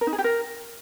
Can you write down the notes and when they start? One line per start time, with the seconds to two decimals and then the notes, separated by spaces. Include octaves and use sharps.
0.01 A#4
0.07 D#4
0.13 G#4
0.19 G4
0.24 A#4